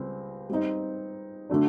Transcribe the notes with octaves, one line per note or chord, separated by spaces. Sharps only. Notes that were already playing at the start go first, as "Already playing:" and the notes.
Already playing: C#2 G3 C4
G3 C4 D#4
D3 F#3 A3 D4